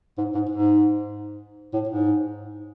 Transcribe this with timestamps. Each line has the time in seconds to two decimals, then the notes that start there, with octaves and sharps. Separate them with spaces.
0.18 G#2
0.35 G#2
0.50 G#2
1.74 A2
1.89 G#2